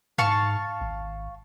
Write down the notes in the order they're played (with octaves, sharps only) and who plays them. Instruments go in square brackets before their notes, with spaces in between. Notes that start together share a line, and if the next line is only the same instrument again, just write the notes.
[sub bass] G#2 [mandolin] F5 A5 C#6
[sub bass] G#1